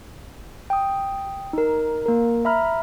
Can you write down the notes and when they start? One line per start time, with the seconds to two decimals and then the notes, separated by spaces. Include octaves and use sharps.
0.70 G5 D#6
1.53 D#4 A#4
2.06 A#3 A#4
2.45 E5 A#5 B5 F6